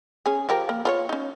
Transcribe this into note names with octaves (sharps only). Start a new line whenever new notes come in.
C#4 G#4
F3 G4 A#4
A#3
F4 C5 C#5
C#4 D#4